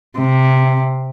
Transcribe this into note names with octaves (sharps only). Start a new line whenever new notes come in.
C3